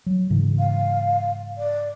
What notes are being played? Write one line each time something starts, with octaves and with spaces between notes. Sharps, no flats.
F#3
G#2 C#3 E3
F5
D5